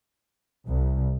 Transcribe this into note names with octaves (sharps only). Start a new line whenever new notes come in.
C2